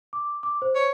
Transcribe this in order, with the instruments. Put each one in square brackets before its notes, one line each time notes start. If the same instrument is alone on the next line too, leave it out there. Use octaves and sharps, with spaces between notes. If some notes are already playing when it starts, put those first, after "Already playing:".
[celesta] D6
D6
C5
[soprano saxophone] C#5